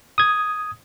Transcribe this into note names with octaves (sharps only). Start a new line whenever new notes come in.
D#6 G#6